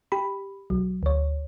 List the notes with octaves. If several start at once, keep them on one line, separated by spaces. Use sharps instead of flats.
G4 B5
B1 F#3
D2 C#5